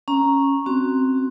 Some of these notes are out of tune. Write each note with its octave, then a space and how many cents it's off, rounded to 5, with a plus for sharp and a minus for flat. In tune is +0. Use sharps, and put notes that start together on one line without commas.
C#4 -10 A#5 +0
C4 +0 F#4 +0